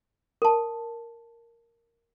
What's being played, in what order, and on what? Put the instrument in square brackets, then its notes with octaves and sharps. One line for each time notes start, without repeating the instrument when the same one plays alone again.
[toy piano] A#4 A5